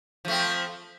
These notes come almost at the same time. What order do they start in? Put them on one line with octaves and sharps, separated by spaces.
F3 A3 C4